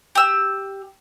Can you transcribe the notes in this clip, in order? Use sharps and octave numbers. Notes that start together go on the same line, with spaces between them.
G4 E6